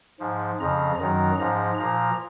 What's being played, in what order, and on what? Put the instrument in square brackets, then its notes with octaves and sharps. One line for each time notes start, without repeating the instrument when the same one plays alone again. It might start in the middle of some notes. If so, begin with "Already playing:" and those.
[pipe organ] G#2 F3
F2 C#3 F3 A#5
F#2 D#3 F#3 A#5
G#2 F3 A#5
A#2 F3 A#5